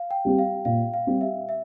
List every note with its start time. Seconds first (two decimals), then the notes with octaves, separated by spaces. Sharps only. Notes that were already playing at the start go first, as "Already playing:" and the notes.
Already playing: F5
0.11 G5
0.25 G3 C4 G4
0.39 F5
0.65 A#2 F5
0.94 F5
1.07 G3 C4 G4
1.21 E5
1.49 E5